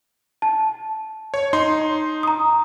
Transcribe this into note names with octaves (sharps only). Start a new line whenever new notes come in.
A5
C#5
D#4 C6
A#5 D#6